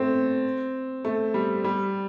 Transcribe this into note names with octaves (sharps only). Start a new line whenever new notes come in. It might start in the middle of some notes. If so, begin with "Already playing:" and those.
Already playing: A3 C4
A3
G3
G3